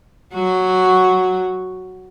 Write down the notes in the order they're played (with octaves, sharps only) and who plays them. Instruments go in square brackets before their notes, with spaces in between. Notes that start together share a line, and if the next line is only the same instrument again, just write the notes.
[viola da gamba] F#3 F#4